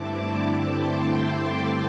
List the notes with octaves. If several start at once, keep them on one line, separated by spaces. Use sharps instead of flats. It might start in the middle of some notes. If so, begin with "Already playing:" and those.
Already playing: G2 D3 A3 C4 E4 A5 D6
G5 C6